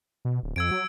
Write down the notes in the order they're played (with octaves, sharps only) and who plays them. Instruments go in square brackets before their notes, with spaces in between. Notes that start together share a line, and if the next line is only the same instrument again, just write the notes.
[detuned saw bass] B2
D1
[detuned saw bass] F2 [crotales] E6 G#6 D7
[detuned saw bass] F#3